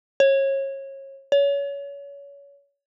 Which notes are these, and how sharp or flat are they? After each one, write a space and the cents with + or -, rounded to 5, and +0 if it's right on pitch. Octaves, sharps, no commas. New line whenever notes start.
C#5 -30
C#5 +25